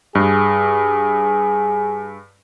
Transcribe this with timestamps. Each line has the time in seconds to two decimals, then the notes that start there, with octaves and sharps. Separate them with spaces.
0.15 G2 G#4